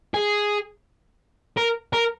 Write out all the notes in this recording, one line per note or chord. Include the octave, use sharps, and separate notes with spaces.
G#4
A#4
A#4